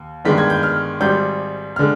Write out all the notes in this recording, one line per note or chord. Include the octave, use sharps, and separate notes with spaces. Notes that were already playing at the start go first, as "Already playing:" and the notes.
Already playing: D#2
G1 G2 D#3 G#3 B6
G#6
G6
F6
G#1 G#2 G3 G6
D3 G#3 F6